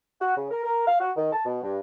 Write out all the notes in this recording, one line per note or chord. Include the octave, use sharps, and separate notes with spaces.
F#4
C#3
A#4
A#4
F5
F#4
D#3
A5
B2
G2